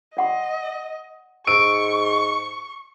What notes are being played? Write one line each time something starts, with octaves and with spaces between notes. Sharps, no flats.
D5 D#5 F#5 C6
G#2 C#6 E6 D7